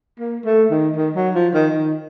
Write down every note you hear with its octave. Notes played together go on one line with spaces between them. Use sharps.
A#3
A3
D#3
D#3
F#3
F3
D#3
D#3